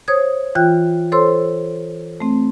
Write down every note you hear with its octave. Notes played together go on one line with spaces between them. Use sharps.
C5 C#5 D#6 G#6
E3 F4 G5 F#6
A4 C5 C#5 C6 E6
A3 C4